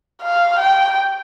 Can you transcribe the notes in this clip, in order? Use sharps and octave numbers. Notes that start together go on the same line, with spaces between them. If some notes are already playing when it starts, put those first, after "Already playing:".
F5
G5